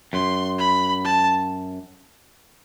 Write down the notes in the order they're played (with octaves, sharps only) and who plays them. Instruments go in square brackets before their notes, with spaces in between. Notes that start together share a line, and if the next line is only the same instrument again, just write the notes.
[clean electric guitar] F#2 [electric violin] C6
[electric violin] B5
A5